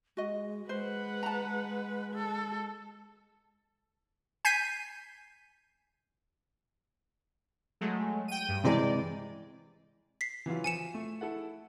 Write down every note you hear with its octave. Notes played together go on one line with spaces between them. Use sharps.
G#3 F#4 D#5
G#3 B4 C5 F#5
A5 A#5
A4
G#5 G6 G#6 B6 C7 D#7
F#3 G#3 A3
G5 D#7
G2
C3 E3 G#3 D5
B6 C7
E3 F#3 F4
F3 G#5 C#7 E7
A3
E4 A4 F#5